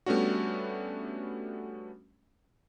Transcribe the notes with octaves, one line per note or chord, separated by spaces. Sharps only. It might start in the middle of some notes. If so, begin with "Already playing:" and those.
G3 A3 B3 C#4 D4 F#4